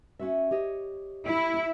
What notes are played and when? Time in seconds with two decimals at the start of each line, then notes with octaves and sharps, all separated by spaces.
0.19 C#4 F#4 E5
0.51 G4 C#5 D#5
1.25 E4